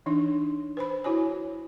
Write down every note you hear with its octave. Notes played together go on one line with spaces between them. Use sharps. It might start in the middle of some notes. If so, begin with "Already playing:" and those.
E3 D4 D#4
B4 C5 B5
E4 F#4 C#5 G#5